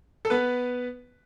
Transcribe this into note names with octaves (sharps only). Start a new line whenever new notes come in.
A4
B3 B4